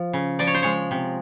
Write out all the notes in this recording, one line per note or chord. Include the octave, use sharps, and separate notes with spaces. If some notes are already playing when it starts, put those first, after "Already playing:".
Already playing: F3
C#3
F3 D5
C#5
C5
G#3 C#5
C3